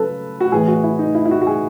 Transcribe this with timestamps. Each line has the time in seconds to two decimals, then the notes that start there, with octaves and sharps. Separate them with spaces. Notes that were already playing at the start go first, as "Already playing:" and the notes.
Already playing: C#3 F#3 A4 B4
0.40 F#4
0.52 A2 E3 G#4
0.68 F#4
0.84 E4
0.99 D#4
1.15 E4
1.26 E4
1.31 F#4
1.42 F#4
1.47 G#4